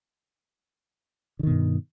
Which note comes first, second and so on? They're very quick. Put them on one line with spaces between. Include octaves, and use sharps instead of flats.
D3 D#3 B2 G2